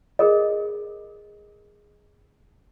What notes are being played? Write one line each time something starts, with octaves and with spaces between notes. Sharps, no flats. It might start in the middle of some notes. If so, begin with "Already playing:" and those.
G#4 A#4 D#5